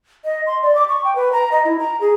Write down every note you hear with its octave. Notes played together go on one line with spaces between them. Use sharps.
D#5
C6
D5
D6
C#6
G5
B4
A#5
D#5
E4
A#5
G#4